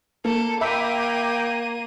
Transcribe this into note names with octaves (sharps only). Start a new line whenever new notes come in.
A#3 A4
A#3 E5 G5 B5 D6 G6 D#7